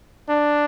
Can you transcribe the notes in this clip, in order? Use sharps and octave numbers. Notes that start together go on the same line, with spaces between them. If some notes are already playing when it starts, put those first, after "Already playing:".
D4